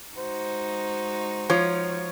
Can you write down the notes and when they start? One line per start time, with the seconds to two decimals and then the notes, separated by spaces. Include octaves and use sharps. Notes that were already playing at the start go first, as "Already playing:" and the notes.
0.17 G#3 D#4 F#4 C5
1.50 F3 C#5